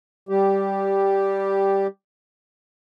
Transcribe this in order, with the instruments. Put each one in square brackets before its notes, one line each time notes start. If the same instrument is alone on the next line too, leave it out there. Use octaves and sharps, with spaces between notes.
[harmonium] G3 G4